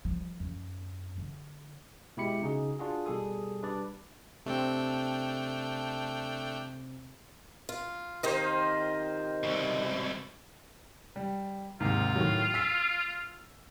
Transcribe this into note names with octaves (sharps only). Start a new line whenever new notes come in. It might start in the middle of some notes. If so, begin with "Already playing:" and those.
F3 G3
F#2
D3
B2 G#3 E4 G4 B5 C#7
C#3 D#4 F#4 G#4
D4 F4 F#4 G#4
B2 G3 G#4 A4 D#6
G3 D4 B4 D5
C3 A3 C4 D4 G5
F4
C3 D#3 F4 C5 D#5
C2 B2
G3
D#2 G#2 C3 F4
A2 D#3 F#3
E6 B6